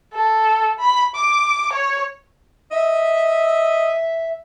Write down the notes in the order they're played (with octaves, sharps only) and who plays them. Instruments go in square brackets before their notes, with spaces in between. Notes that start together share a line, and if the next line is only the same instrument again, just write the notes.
[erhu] A4
B5
D6
C#5
[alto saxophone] D#5 [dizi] E5